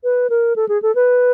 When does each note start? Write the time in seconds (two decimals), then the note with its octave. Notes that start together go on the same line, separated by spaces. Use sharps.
0.04 B4
0.30 A#4
0.56 A4
0.69 G#4
0.82 A4
0.95 B4